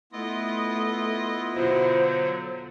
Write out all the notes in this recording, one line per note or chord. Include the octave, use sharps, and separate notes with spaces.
A3 B3 E4 F4 D#5 D#6
B2 D3 F#3 F4 C5